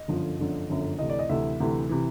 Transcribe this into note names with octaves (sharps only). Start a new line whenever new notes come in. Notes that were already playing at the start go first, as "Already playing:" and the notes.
Already playing: D#5
G1 F#2 D3 F3
G1 F#2 D3 F3
G1 F#2 D3 F3
D2 C3 E3 D#5
D5
D#5
D2 C3 E3 E5
D2 C3 E3
C3 E3